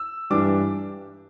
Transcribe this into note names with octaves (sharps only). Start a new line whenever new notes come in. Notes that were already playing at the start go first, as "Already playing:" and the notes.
Already playing: E6
G2 E3 G3 D4 D6